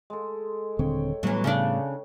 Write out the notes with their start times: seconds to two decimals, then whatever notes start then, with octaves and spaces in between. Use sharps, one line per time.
0.10 G#3 A4
0.79 D#1 D3 C4 C#5 G5
1.23 A2 E3 F#3 G3 B3
1.44 C#3 C#4 D4